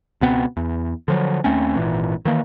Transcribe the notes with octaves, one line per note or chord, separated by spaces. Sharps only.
C#2 B2 B3 C4
E2
D3 F3 F#3
D#2 A3 C4 C#4
G#1 F2 A#2 E3
D#3 E3 A#3